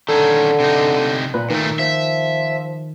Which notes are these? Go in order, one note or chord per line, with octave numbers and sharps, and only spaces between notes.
D3 D#3 C#4 A4
C3 D#4
A#2 B4
A#2 D#3 A3
F3 E5